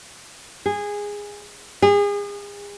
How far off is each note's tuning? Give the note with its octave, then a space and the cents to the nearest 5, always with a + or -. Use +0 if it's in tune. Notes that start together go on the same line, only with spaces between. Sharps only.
G#4 -15
G#4 -35